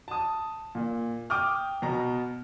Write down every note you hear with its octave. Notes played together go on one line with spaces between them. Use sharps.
A5 D#6
A#2
G5 D6 D#6 F6
B2 B3 A#5